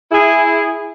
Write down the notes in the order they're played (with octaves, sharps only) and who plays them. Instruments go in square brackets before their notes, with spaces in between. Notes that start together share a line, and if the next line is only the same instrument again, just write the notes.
[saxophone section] E4 G#4